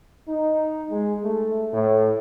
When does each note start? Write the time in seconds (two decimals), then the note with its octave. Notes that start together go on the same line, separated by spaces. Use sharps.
0.28 D#4
0.91 G#3
1.24 A3
1.73 A2